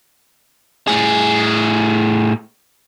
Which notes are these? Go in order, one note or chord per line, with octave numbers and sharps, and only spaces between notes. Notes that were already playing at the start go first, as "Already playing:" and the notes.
A2 G#4